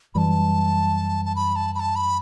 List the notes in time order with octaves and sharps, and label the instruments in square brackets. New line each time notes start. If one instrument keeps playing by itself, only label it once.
[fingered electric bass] F#2 E3 G3 [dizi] A5 B5
[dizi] A5
B5
A5
B5
A5
B5